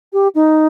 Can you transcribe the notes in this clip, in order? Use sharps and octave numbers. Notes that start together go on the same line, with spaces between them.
G4
D#4